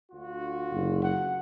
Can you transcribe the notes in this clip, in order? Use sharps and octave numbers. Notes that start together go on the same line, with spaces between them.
D2 F4 F#4
F#1
F#5